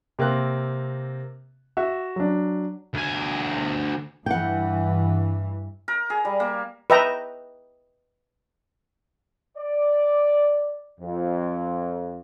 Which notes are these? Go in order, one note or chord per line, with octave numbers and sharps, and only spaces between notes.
C3 A#3 C4 F#6
F#4 E5
F#3 D4
D2 G#5
G2 E3 F#5 G5
A#4
G#4
G3
A#3
B4 D#5 E5 G5 A#5
D5
F2